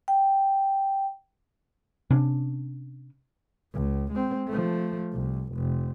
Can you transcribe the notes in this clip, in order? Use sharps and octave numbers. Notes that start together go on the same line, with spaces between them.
G5
C3 C#4 D4
C#2
G#3 C4
F3 A3
C2
F1